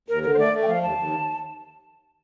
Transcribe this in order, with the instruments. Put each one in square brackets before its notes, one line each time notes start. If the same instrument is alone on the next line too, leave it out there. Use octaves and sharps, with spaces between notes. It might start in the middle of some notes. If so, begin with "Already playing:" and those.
[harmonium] D#2 [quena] A#4
[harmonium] D3 [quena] A#4
[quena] C5
[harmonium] A3 [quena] D5
[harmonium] A3
[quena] G5
[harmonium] F3 [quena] F5
[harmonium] D#2 [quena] A5
[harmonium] D#2